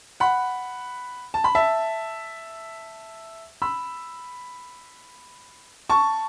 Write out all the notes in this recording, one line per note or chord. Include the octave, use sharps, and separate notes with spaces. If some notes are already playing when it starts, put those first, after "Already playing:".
F#5 B5
A5
B5
E5 A5
B5 E6
A5 C#6